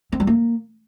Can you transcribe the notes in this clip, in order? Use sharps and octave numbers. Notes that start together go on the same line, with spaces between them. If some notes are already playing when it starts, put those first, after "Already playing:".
C4
G3
A#3